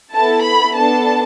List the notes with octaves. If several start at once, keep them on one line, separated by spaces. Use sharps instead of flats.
B3 E4 A4 A5
B5
B3 D4 A4 A5